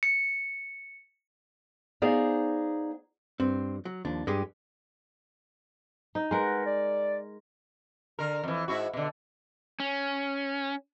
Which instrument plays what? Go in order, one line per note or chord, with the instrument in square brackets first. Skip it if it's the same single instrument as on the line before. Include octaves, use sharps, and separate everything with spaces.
[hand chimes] C#7
[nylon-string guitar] B3 D#4 G#4 C5 D5 F5
[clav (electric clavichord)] G2 [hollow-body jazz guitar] C4
[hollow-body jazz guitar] F#3
[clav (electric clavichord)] D#2 F3 [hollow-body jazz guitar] D4
[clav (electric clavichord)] G2 [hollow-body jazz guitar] G#3 G4 G#4
[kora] D#4
[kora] G#3 A#4 [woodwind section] B4 F#5
[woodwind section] D5
[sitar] D3 A#4
F2 E3
G#2 E4 F#4
B2 D3
[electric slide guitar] C#4